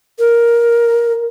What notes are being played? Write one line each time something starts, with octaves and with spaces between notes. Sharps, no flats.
A#4